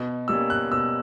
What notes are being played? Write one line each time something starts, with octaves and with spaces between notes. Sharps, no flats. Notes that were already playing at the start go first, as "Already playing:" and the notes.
Already playing: B2
G3 A#3 C#4 E6
F#6
B2 E6